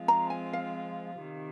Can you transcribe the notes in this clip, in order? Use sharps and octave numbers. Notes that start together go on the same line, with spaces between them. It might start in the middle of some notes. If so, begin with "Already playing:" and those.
Already playing: F3 G#3 C4 F4
A#5
G#5
F5
C3 D#3